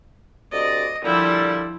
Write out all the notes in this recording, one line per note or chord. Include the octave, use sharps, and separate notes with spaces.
D2 C3 D5 D#5
A#2 D3 F3 G3 E4